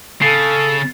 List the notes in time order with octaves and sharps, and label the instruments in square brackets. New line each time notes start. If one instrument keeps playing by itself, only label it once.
[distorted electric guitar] C#3 [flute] A4 [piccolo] A6 [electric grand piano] C7